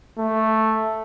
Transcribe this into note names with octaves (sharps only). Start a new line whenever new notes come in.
A3